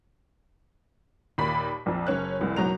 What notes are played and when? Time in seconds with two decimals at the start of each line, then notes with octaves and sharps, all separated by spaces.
1.38 D#2 A#2 B5 B6
1.86 A#1 F2
2.07 F#1 C#4 F#6
2.39 F1 C2 A2
2.56 F#1 B1 F#3 A#5 F7